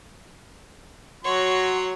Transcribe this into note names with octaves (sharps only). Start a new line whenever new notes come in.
F#3 F#4 C#5 C6